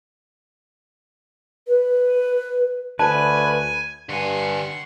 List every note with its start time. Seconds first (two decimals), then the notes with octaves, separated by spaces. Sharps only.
1.66 B4
2.99 D2 B4 G#5 A5
4.09 G2 D3 F#5 G#5 C6 C#6